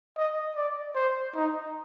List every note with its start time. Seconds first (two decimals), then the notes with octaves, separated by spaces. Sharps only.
0.17 D#5
0.56 D5
0.95 C5
1.35 D#4